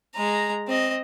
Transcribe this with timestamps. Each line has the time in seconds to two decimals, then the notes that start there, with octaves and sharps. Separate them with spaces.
0.15 G#3 A#5
0.68 C4 D#5